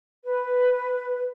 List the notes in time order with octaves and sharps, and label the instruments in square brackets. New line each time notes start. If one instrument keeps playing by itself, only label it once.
[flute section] B4